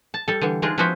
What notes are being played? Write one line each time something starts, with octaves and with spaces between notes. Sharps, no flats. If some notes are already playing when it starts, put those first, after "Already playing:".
A5
G3 A4
D3 E3 G3
G#3 D4 D#4 F4 G#4
F3 B3 C#4 F#4 C5 E5